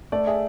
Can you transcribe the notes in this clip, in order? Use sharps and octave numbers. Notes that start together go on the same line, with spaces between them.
A3 D5
G#4 E5